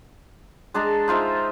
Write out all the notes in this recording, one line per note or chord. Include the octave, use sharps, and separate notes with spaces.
G#3 D4 A5 A#5
D#4 F4 C5 E5